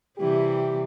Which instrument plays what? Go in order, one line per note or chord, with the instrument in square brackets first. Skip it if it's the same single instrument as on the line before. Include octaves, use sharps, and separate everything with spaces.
[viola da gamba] C3 E3 G3 [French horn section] G4